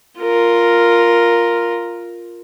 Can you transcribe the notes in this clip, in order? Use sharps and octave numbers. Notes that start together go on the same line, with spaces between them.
F4 A#4